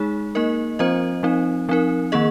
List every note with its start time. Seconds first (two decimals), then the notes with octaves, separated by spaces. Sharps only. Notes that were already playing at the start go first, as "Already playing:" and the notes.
Already playing: G#3 D#4 G#4
0.35 A#3 D#4 A#4 D#5
0.79 F3 C4 F4 C5 D#5
1.23 F3 C4 D#4
1.69 F3 C4 D#4 A#4
2.12 D#3 A#3 G#4 D#5